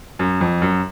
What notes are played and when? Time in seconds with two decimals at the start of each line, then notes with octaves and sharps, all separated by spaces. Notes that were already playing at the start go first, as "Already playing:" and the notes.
0.19 F#2
0.41 F2
0.62 F#2